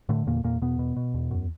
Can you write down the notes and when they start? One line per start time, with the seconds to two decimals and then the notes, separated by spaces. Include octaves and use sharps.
0.09 A2 D3 A3
0.27 E2 A#2 A#3
0.43 E2 A#2 A#3
0.62 E2 B2 B3
0.79 B2
0.96 B2
1.14 E2
1.31 F#2